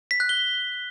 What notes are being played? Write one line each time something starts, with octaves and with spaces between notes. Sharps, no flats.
B6
F#6
G7